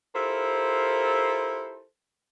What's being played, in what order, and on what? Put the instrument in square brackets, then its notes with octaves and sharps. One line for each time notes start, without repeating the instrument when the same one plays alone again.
[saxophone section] E4 F4 G4 A4 A#4 C5